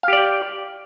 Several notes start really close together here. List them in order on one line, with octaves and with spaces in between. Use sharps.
F5 G4 D5 G5